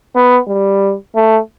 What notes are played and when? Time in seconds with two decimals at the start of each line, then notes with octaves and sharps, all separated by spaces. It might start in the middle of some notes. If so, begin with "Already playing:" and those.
0.16 B3
0.48 G3
1.15 A3